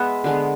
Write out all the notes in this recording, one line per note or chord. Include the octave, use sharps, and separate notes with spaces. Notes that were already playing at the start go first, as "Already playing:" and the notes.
Already playing: G#3 B3 E5 F#5
D3 G#3 B3